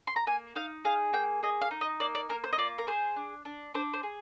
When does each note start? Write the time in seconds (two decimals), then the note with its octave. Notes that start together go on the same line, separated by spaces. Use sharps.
0.07 C6
0.16 A#5
0.27 A#3 G#5
0.55 D#4 F5
0.85 G#4 F5
1.13 A#3 G5
1.43 G#4 D#5
1.61 F5
1.71 D#4
1.81 D#5
2.00 A#3 D5
2.15 D5
2.29 A#3 A#4
2.44 C5
2.53 D#5
2.58 F4 D5
2.78 A#4
2.87 G#4 C5
3.16 D4
3.45 D4
3.74 D4 C5
3.93 C5
4.03 G#4